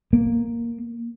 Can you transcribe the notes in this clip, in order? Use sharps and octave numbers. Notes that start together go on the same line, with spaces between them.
A#3